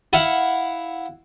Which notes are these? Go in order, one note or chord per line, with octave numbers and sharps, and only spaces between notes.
E4 F5 F#5